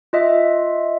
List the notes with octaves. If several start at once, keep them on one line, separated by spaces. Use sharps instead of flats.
F4 D#5 E5